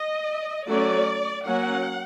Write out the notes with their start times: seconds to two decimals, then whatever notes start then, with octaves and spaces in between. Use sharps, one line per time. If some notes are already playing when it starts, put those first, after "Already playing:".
Already playing: D#5
0.68 F#3 A3 C#4 D5
1.45 F#3 A#3 C#4 F#5